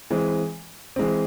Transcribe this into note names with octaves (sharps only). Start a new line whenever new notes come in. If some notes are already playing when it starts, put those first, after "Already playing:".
E3 G#3 C4
E3 G#3 C4